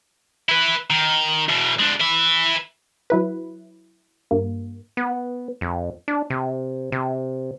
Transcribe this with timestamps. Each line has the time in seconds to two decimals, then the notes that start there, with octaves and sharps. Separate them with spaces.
0.49 E4 B4
0.90 D#3
1.49 E2 B2
1.79 G#3 D4
2.00 B4 E5
3.10 F#3 E4 B4
4.31 G2 A#3
4.97 B3
5.61 F2
6.08 D4
6.30 C3
6.92 C3